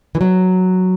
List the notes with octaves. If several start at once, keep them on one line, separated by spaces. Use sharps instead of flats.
E3
F#3